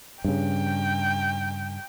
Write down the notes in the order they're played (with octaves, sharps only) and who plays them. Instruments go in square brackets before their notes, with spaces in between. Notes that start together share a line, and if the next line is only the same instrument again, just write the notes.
[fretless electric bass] G2 C#3 [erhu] G5